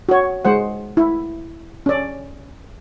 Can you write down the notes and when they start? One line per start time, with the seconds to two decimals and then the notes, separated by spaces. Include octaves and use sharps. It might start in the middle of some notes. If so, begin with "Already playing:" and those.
0.09 F#4 C#5
0.45 G#3 C5 F#5
0.97 E4
1.86 C#4 D5